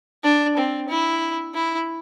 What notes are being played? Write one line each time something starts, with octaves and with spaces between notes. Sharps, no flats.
D4
C4
E4
E4